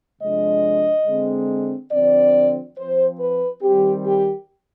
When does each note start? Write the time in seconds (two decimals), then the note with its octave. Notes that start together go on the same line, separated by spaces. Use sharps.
0.21 C3 F3 G#3 D4 D#5
1.06 D3 G#3 C4
1.92 D3 F3 C4 D5
2.77 F3 C4 C5
3.20 B4
3.62 D#3 G3 C4 G4
4.06 G4